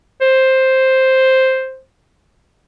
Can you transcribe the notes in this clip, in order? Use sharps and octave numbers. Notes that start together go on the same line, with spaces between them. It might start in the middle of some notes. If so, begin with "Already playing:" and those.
C5